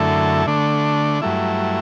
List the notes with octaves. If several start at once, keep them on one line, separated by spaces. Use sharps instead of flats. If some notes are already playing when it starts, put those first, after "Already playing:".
Already playing: F#2 D3 A3 E4 A4
D3 A3 D4
G2 F#3 A3 E4